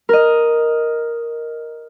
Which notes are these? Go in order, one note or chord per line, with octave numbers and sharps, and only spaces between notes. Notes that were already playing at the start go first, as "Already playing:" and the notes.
A#4 D#5